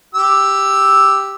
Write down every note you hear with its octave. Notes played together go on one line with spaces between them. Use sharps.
G4 E6